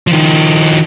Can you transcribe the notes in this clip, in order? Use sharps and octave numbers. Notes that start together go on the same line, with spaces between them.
D#3 F3